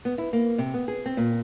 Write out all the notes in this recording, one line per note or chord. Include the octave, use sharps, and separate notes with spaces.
B3
E4
A#3
C3
B3
G#4
C4
A#2